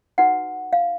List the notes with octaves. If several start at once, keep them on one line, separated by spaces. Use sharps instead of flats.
D#4 F#4 B4 F#5
F5